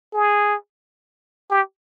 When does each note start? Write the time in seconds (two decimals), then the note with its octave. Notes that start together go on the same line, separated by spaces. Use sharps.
0.14 G#4
1.51 G4